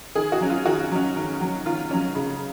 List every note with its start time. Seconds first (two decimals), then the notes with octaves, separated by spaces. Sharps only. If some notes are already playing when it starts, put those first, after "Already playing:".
0.15 D#3 G#4
0.32 F#4
0.41 F#3 C#4
0.50 F4
0.65 D#3 F#4
0.91 F#3 C#4
1.16 D#3
1.41 F#3 C#4
1.65 D#3 F4
1.91 F#3 C#4
2.15 C#3